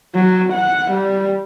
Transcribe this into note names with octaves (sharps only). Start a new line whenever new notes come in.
F#3
F#5
G3